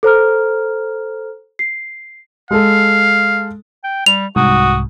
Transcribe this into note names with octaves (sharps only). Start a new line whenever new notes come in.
A4 C5 A#5 F6
C7
G#3 A4 F5
G5
G3 F7
C2 G#2 F#4 D#6